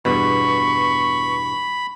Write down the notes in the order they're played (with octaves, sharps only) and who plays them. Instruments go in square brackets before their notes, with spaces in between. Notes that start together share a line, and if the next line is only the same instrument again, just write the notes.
[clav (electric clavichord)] E2 G2 B2 [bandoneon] B5 [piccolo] C#6